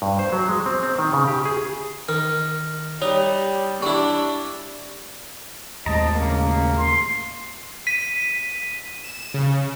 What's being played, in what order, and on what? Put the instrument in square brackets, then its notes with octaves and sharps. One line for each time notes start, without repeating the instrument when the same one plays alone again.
[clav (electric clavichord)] G2
C5
F#3
G#3
C4
C4
D#3
C#3
G4
G#4
[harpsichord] D#3 [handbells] F6
[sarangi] G3 [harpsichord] D#4 [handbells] C#5
[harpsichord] G3 E4 [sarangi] D4 [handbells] C#6
[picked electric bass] D#2 A2 G#3 [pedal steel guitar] C4 A5 A#5 [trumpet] D#5
[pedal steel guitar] C#3 [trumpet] A#3
[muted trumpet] C6
[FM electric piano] B6 [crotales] D#7
[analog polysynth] E7
C#3